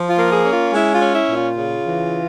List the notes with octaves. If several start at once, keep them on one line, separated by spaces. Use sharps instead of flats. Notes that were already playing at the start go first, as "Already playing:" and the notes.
Already playing: F3
F4
A#3
G#4
C#4
F4
G#3 E4
F4
C#4
E4
A#2
F4
C#3
E3